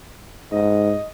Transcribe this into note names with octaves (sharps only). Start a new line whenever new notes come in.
G#2 D#5